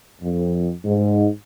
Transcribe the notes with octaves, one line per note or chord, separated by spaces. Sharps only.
F2
G#2